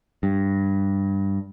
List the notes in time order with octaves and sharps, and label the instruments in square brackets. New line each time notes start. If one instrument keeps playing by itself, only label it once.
[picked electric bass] G2